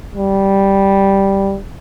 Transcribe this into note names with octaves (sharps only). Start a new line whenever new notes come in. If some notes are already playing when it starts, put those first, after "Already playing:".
G3